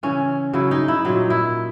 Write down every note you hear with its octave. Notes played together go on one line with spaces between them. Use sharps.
C#3 E3 C#4
C#3 F#3 E4
D#4
E4
A#2 F#3 D#4
E4